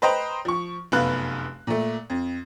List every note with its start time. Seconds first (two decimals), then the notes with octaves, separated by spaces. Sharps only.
0.02 B4 C5 D#5 G5 A#5
0.45 F3 C#6
0.92 F1 F#2 B3 B4 F5 F#6
1.67 A#2 A3
2.10 F2